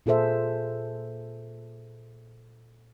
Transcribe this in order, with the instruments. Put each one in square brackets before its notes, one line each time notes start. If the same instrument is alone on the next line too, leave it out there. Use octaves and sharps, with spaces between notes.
[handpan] A#2 F4 G#4 A4 C5 E5